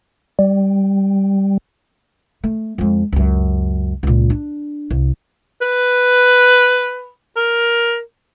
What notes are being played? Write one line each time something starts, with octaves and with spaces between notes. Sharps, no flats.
G3
A3
F2 G#3
C#2 F#2
C#2 A#2
D4
C2
B4
A#4